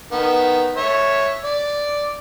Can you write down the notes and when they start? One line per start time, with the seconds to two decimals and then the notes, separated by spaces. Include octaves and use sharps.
0.12 D#3 B3
0.77 C#5 E5
1.44 D5